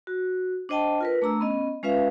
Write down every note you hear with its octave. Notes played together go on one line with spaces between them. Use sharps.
F#4
D4 C5 D#5 G5 A5
F4 A#4 B4
A3 D4 A#5 E6
B3 C#4 D#5
G#3 C#4 F4 B4 E5 F5